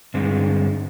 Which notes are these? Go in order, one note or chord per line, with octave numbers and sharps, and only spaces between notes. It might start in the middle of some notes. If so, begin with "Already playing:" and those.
G2 D3 G#3 C4